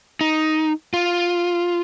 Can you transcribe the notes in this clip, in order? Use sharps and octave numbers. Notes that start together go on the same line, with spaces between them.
D#4
F4